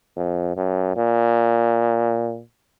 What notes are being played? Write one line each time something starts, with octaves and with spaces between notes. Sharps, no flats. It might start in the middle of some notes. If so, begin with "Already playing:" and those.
F2
F#2
A#2